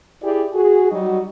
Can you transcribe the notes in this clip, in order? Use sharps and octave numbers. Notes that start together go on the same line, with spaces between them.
E4 G4 G#4 D5
F#4 G#4
F#3 G3 D#4 F#4